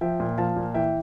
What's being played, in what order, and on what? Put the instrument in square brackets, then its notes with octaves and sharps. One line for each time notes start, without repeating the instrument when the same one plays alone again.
[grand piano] F3 E5 G5
A#2
F3 F5 A5
A#2
E3 E5 G5